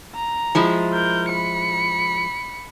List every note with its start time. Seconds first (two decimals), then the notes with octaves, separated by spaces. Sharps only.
0.15 A#5
0.55 F3 G#3 E4
0.93 A#4 G6
1.29 B5 C#7